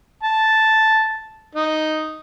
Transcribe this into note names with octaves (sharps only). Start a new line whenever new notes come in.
A5
D#4